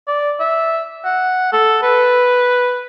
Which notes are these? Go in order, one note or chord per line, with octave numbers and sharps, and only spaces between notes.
D5
E5
F#5
A4
B4